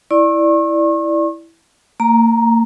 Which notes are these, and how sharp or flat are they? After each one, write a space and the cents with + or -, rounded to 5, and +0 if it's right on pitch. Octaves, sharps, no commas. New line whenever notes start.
E4 +0 D5 +5 C#6 -40
A#3 -35 A#5 +5